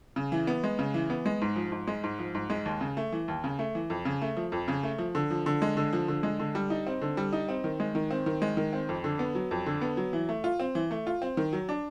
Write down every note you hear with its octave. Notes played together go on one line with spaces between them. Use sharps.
C#3
E3
B3
G#3
C#3
E3
B3
G#3
G#2
F3
G#2
G#3
G#2
F3
G#2
G#3
D#2
C#3
A3
E3
D#2
C#3
A3
E3
F2
C#3
A3
F3
F2
C#3
A3
F3
D3
F3
D3
G#3
D3
F3
D3
G#3
D3
G3
D#4
C4
D3
G3
D#4
C4
D#3
G#3
D#3
C4
D#3
G#3
D#3
C4
F2
D3
B3
F#3
F2
D3
B3
F#3
E3
A3
F4
C4
E3
A3
F4
C4
D#3
F#3
D4